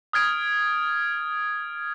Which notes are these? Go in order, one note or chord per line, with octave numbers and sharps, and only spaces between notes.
D#6 F6 G#6 D7